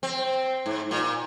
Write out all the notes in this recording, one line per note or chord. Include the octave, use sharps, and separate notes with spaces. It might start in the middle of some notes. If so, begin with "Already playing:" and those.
C4
G#2
A#2